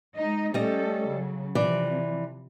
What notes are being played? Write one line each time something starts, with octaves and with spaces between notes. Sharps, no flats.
G#3 D#4 D#5
G3 A3 C#4 A4 D#5
C#3 F#3
C3 E3 F3 D5